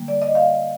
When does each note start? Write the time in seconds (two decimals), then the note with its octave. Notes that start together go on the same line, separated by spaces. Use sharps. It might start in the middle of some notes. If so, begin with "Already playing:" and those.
Already playing: D3 G3 A#3
0.08 D5
0.22 D#5
0.35 F5